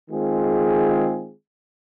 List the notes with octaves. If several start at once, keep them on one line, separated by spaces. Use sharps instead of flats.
D#3 G#3 C4 F4 G#4